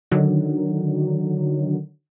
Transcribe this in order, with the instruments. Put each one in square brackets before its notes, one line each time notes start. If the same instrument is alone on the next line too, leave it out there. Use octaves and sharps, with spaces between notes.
[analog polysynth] D3 D#3 F#3